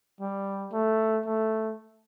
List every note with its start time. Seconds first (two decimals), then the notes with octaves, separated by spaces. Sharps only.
0.20 G3
0.72 A3
1.25 A3